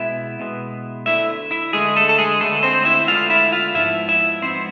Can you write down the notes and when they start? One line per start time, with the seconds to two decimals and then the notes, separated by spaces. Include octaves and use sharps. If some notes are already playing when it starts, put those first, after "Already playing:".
Already playing: B2 G#3 B3 E4 E5
0.39 B2 G#3 B3
1.06 D2 D3 A3 E4 E5
1.51 E4 E5
1.73 D2 D3 G#3 A3 G#4
1.96 A3 A4
2.09 A4
2.19 G#3 G#4
2.40 D2 D3 G#3 A3 B3 A4
2.63 C4 C5
2.85 E4 E5
3.08 D2 D3 G#3 B3 F4 F5
3.30 E4 E5
3.52 F4 F5
3.74 G#2 F3 B3 E4 E5
4.09 E4 E5
4.42 G#2 F3 B3 C4 C5